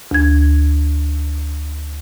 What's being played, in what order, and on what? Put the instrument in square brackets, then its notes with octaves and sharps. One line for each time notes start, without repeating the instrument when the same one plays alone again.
[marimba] D2 G#6